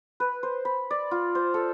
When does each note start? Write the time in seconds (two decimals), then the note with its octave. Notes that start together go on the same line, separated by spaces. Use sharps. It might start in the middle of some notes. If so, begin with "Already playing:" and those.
0.20 B4
0.43 C5
0.65 B5
0.91 D5
1.11 F4
1.35 C5
1.54 A4